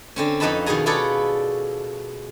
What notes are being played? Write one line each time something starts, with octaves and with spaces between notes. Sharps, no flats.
D3 C4 C#4
F2 D#4 B4 D#5 A5 B5
B2 D#3 D#4 G#4 G#5 A#5
F4 G#4 A4 B4 C#5 D5